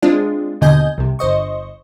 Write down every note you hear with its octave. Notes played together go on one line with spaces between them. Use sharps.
G#3 C4 D4 F4
D#2 B2 D3 D#5 G#5 G6
C2 C3
G1 C5 D#5 C#6